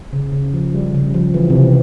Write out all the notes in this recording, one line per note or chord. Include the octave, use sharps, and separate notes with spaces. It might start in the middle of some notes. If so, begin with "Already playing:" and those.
C#3
C#3
F3
G3
C#3
F3
E3
C3
C#3